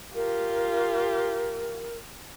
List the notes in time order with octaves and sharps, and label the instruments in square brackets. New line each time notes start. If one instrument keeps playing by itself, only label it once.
[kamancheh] F4 G4 [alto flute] A#4